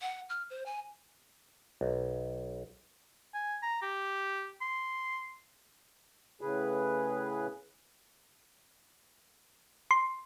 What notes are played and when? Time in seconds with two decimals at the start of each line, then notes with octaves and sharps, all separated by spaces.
0.01 F#5
0.29 F6
0.50 C5
0.66 G#5
1.81 B1
3.34 G#5
3.63 A#5
3.82 G4
4.61 C6
6.41 A2 C#3 G#4 B4
9.91 C6